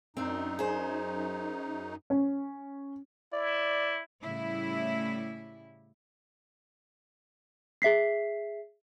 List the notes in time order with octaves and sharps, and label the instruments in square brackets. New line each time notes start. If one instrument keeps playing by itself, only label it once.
[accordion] F#2 D#4 [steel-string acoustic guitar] C4 D4
[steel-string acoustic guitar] G#4 C5
[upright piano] C#4
[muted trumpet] E4 [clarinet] D5
[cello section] A2 C#3 G3 E4
[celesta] G#4 E5 B6 C7